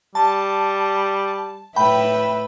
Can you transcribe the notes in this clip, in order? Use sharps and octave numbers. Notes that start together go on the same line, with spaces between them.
G3 A5
A2 B4 E5 G5 B5